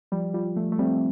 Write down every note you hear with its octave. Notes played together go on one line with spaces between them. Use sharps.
F3 G3
G3 F4
F3 A3
A3
G3 C4